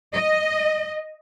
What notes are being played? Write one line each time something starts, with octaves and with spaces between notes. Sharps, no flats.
D#5